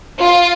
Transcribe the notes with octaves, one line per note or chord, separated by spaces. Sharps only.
F4